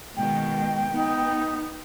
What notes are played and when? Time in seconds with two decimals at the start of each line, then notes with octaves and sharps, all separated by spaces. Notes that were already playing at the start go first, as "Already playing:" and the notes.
0.17 B2 D#3 G#3 G5
0.92 B3 D#4